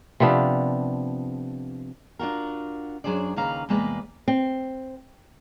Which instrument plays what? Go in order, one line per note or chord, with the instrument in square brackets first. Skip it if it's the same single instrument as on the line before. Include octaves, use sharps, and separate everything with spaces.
[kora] C3 F3 B3 D4
[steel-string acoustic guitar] D4 F4 F#4 A#4
F#2 F#3 D4 G#4 C5 D5
D#2 C#3 A#3 B4 F5 A#5
E2 C3 G#3 A#3 B4 D5
[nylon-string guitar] C4